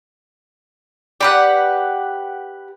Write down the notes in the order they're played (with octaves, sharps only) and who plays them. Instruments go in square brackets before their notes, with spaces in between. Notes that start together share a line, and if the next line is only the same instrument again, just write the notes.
[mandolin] G4 B4 F#5 [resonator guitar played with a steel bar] D5